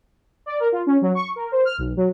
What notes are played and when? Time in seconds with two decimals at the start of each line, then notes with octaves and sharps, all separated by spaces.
0.46 D5
0.60 A#4
0.72 F4
0.86 C#4
1.02 F#3
1.15 C#6
1.36 A#4
1.52 C5
1.65 F6
1.78 B1
1.97 F#3